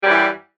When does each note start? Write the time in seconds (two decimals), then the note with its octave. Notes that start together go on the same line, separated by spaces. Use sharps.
0.02 G3
0.05 F#2
0.08 E3